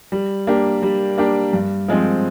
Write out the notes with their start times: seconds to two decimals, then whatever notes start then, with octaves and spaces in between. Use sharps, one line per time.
0.12 G3
0.47 A#3 D4 G4
0.83 G3
1.18 A#3 D4 G4
1.53 G2
1.88 F3 G#3 C4